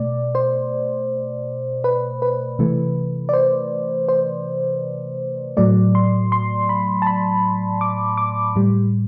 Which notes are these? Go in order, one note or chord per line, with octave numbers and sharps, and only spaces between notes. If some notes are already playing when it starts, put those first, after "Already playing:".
Already playing: B2 A3 D5
C5
B4
B4
C3 E3 A3
D5
C5
C5
A2 F#3 A3 D5
C6
C6
B5
A5
B5
D6
D6
A2 G3